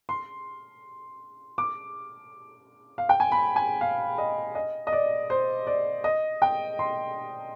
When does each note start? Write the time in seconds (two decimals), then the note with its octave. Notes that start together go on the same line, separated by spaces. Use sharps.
0.09 C6
1.58 D6
2.98 F5
3.09 G5
3.20 G#5
3.32 B5
3.56 G#5
3.81 F5
4.18 D#5
4.55 D#5
4.87 D#5
4.92 D5
5.30 C5
5.67 D5
6.04 D#5
6.42 G5
6.79 C6